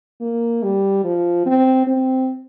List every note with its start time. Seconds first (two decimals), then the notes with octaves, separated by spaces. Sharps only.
0.21 A#3
0.63 G3
1.04 F3
1.46 C4
1.87 C4